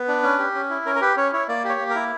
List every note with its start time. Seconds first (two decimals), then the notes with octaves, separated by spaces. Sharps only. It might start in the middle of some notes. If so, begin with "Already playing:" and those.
Already playing: B3 B4
0.08 D4
0.23 C#4
0.39 G4
0.54 C#4
0.70 E4
0.85 C#4 A#4
0.95 A#4
1.01 G4 B4
1.17 C#4 C#5
1.33 E4 C#5
1.48 A#3 D5
1.64 G4
1.69 C#5
1.80 A#3
1.90 A#4
1.95 E4